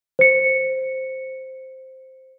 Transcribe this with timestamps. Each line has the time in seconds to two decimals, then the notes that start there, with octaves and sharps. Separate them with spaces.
0.19 C5 C#7